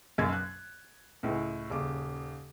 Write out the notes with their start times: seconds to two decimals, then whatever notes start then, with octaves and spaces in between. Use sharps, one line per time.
0.18 B1 F#2 A#3 G#6
0.32 F#6
1.23 C#2 A2
1.70 D#1 C#3 D6